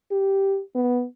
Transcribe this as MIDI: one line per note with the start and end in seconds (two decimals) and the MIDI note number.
0.11 0.60 67
0.75 1.05 59